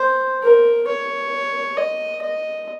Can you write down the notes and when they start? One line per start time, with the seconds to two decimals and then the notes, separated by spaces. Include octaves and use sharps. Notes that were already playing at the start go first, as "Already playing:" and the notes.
Already playing: C5
0.43 A#4
0.88 C#5
1.77 D#5
2.22 D#5